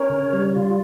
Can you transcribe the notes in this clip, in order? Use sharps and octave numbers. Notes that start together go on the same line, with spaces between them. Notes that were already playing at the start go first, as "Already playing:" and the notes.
Already playing: C#4 A#4 C#5
C#3
G3
F4